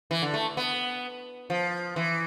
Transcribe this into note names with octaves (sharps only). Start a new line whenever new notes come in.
E3
D3
A3
B3
F3
E3